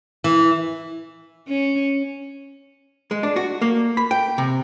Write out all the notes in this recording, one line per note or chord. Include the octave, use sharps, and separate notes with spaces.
E3
C#4
G#3
D4
F#4
A#3
B5
G5
C3